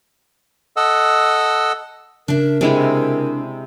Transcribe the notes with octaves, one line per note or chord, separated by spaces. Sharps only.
A4 D#5 F#5 E6
C#3 D4 A#4 E5
C3 G#3 D4 E4